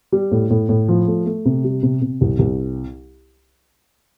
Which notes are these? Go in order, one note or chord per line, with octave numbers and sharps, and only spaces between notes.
G3
A2
A2
A2
F3
A3
A3
C3
G3
C3
C3
C2
C2